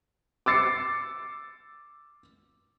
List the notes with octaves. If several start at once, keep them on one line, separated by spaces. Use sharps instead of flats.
D6 E6 A6 C7 C#7